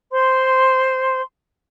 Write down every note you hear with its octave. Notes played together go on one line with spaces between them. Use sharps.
C5 C6